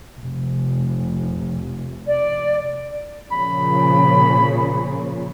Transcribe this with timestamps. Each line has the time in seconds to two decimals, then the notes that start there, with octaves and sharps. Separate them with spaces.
0.19 F1
2.07 D5
3.32 A#2 C#3 F3 B5